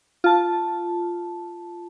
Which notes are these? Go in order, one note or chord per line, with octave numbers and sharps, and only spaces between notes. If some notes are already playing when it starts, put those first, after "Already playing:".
F4 A5